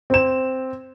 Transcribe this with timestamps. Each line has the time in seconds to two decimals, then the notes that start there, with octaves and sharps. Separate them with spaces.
0.10 C4 E7